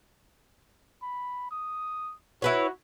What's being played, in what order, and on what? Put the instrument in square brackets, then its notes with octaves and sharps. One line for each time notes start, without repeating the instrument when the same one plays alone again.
[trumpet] B5
D#6
[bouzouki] E4 B4 C#5 [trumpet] F#4